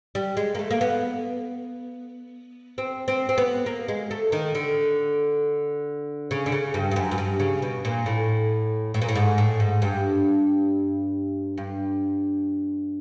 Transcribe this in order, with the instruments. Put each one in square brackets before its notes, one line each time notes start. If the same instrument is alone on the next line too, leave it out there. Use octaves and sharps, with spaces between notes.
[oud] G3
G#3
A#3
A3
A#3
B3
C4
C4
C4
B3
A#3
G#3
A3
D#3
D3
C#3
D3
C#3
G2
G2
F#2
F#2
G2
C#3
B2
A#2
A2
A2
A#2
A2
G#2
A2
G#2
G2
G2